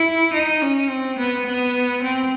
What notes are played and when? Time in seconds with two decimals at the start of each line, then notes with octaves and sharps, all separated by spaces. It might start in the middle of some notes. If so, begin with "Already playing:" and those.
Already playing: E4
0.33 D#4
0.62 C#4
0.89 C4
1.18 B3
1.46 B3
2.03 C4